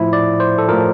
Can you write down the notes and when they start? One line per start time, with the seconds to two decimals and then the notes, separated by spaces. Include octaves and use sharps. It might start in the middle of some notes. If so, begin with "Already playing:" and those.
Already playing: A2 F3 E4
0.13 D5
0.40 C5
0.58 A4
0.68 A2 F3 A#4